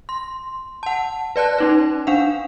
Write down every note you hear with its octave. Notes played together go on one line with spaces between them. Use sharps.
C6
F#5 A5
B4 D5 A5 F#6
C#4 D#4 B4
D4 F5 F#5